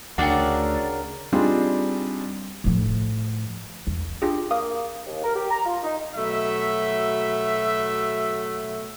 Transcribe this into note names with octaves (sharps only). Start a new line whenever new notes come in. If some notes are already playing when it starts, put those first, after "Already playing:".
D2 C#3 D4 F#4 A#4 D5 F#5 G5
G3 C4 D4 D#4 F4 G#4
A2 F3
E2
D4 F4 G4 G#4
A#3 F5 D#6
D#2
A#4
G4
A#5
F4
D#4
B2 F#3 A3 E5